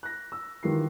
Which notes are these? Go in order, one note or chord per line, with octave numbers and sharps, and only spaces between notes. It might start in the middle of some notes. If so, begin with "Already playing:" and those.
F#6 A#6
E6
D#3 E3 F4 G4 C7